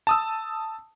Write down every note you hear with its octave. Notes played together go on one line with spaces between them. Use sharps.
A5 D#6 E6